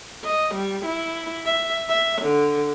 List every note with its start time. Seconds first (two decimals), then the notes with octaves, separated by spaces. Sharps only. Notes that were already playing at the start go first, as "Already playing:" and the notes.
0.24 D#5
0.55 G3
0.86 E4
1.46 E5
1.89 E5
2.22 D3